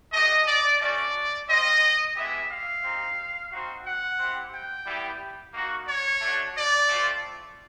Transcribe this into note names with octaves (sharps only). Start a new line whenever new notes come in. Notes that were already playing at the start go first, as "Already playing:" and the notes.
A3 D4 G4 D#5
D5
A3 C#4 F#4 D5
C4 F4 D#5
G#3 B3 E4 G4 E5
F5
C4 D#4 G4
C4 D#4 F#4
F#5
C4 E4 G4
G5
G3 B3 E4 G4
A#3 D#4 F#4
C#5
A3 D4 F#4
D5
A3 C4 F4